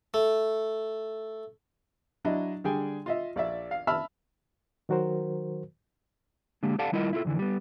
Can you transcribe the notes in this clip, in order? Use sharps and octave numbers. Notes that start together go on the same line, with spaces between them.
A3
F#3 D4 E4 D#5
D3 G3 G#4 G5 G#5
F4 D#5 E5
A#1 D5 E5
F5
E5 A5 B5 E6 F6
D#3 F#3 F#4 A#4 C5
D3 G#3 A#3 G4
G4 A4 D5 F5 F#5 A5
D#2 G3 E4 F4 A#4 D#5
E4 F4 A4
F2 D3 E3
G3 B3